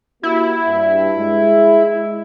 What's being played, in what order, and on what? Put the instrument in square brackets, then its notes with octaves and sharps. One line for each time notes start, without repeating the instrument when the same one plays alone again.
[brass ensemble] A#3 F#4 G4 [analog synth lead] E4
[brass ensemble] G2
G#3